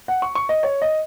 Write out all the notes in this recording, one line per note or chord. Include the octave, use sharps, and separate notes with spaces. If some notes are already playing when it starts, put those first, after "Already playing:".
F#5
C#6
C#6
D#5
C#5
D#5